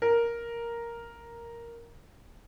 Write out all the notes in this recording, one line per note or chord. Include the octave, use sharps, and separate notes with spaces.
A#4